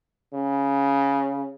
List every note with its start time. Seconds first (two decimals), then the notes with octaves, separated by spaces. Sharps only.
0.34 C#3